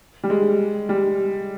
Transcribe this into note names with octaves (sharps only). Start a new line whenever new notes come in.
G3
G#3
G3